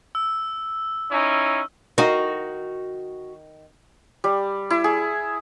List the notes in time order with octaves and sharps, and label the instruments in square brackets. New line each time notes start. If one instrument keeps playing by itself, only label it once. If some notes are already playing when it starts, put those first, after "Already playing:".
[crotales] E6
[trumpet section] C#4 D#4 E4
[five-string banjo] D#3 D#4 [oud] F#4 F5
[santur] G3
E4
G#4